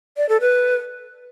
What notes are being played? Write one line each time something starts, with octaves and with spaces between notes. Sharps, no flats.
D5
A4
B4